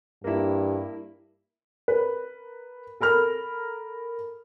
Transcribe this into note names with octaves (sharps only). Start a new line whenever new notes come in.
G2 A#3 E4
A#4 B4
A4 A#4 B5 F6